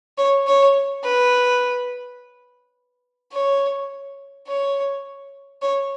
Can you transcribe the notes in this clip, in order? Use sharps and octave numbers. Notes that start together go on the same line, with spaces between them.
C#5
C#5
B4
C#5
C#5
C#5